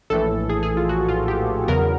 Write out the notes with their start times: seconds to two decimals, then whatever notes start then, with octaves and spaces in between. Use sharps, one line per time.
0.10 A#1 A2 E3 A4
0.49 G#4
0.63 G#4
0.77 F4
0.89 F#4
1.09 F4
1.28 G4
1.68 E2 C#3 F#3 B3 A#4